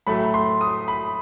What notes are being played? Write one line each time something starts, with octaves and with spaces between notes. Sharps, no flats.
A2 F#3 A3 B5
C6
D#6
B5